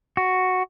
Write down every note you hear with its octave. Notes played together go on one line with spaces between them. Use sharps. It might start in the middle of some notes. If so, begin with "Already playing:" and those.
F#4